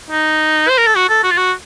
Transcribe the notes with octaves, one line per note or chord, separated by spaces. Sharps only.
D#4
C5
A#4
A4
F#4
A4
F#4
F4
F#4